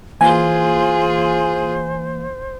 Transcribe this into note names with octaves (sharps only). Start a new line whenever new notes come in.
E3 A#3 F4 G#4 C5 G#5